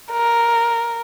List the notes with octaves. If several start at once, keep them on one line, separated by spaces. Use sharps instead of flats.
A#4